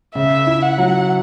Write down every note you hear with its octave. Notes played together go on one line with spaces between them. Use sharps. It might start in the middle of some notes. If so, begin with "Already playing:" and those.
C#3 E5
E4
F#5
F#3